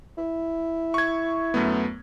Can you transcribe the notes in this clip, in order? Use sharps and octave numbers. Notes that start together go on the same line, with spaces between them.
E4
C#6 G#6
F#2 A3 B3